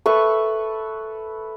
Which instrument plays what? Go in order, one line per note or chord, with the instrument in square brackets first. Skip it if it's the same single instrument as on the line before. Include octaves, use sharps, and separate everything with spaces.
[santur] A4 B4 E5 C#6